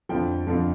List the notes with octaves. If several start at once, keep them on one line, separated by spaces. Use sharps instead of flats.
F2 D3 F3 G5
F2 D3 F3